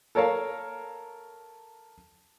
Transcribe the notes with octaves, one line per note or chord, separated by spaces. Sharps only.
A4 A#4 C#5 F5 A5